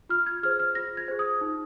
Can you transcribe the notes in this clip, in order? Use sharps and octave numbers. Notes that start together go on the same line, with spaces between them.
F4 F6
G#6
G#4 C5 F6
F6
F4 A#6
G#6
G#4 C5
D#6
D#4